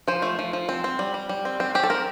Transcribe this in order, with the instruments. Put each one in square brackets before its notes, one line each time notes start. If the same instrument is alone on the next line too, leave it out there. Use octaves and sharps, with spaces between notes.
[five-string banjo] F3 C5
A3
F3
F3
C4
C4
G3
G3
G3
C4
C4
C4 G4
A4
C4 A#4